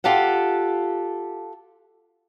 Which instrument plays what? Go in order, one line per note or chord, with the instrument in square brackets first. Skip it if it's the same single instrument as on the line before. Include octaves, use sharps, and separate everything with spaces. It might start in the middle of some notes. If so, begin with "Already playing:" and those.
[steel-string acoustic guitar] F4 G4 A4 F#5